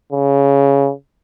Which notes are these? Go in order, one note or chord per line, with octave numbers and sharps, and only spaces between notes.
C#3